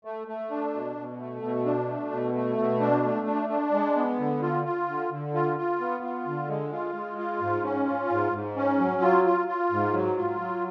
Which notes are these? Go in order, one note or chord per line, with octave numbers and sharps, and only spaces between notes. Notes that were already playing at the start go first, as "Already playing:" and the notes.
A3
A3
D4
B2
B2
A3
B2
D4
A3
B2
A3
B2
D4
A3
D4
D4
G#3
B3
D3
F4
F4
D3
D3
F4
F4
B3
F4
D3
G#3
F4
G#3
F4
G#2
C#4
F4
G#2
G#2
C#4
F#3
F4
F4
F4
G#2
F#3
F4
F#3